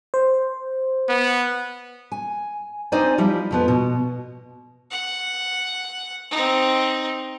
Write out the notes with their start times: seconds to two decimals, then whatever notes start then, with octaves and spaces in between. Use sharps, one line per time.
0.14 C5
1.09 B3
2.12 G#5
2.92 C4 D#4 C5 D5 G#5
3.18 F3 G3 E4
3.51 F2 F3 B3
3.68 B2
4.91 F#5
6.31 C4 D#4